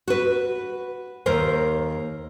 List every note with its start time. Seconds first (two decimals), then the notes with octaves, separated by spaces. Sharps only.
0.08 F#4 B4
1.26 D#2 A#4 C5